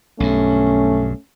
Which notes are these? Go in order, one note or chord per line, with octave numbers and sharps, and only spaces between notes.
B1 G2 A3 C#4